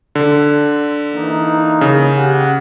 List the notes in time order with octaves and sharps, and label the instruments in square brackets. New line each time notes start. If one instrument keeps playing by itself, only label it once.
[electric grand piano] D3
[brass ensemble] E3 A#3 D#4
[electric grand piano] C#3
[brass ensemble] G4 F#5